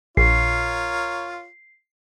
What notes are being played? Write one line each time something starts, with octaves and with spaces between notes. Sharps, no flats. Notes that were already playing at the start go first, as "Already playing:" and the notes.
A#1 F4 A#4 C#5 C7